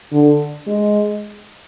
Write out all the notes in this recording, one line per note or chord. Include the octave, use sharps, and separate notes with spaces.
D3
G#3